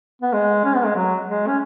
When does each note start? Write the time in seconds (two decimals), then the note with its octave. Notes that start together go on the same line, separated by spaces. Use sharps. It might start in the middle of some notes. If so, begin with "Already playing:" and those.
0.22 B3
0.33 G#3
0.65 C#4
0.75 B3
0.85 G#3
0.96 F#3
1.26 G#3
1.47 C#4